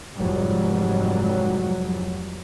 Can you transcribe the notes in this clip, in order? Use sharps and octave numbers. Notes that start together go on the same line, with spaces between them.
F1 F2 G#2 F#3 G3